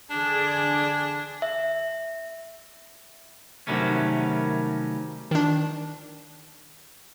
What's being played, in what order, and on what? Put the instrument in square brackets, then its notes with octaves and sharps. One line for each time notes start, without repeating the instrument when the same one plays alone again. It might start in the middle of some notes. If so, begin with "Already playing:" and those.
[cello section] D3 G#4 D5 [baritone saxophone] D4
[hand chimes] E5
[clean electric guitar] C3 D#3 F#3 G3 A3 C#4
[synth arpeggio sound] D#3 D4